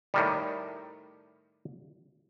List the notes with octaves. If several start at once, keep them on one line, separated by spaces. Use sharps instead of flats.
A2 D#3 G3